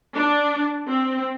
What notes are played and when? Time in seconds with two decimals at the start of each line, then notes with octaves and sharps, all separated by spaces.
0.15 D4
0.87 C4